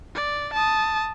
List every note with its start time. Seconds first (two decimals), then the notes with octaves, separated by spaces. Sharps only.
0.15 D5
0.54 A5 D#6